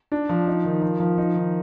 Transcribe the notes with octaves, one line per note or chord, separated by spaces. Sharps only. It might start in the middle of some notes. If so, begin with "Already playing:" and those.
D4
F3
D#4
D#3
F3
F3
D#4
D#3